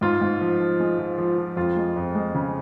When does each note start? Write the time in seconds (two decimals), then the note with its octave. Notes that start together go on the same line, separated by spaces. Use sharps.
0.01 G#2 F4
0.21 G#2
0.41 F3
0.60 F3
0.80 G#3
0.99 F3
1.18 F3
1.38 F3
1.56 F2 F4
1.76 G#3
1.96 F2
2.15 G#3
2.35 C#3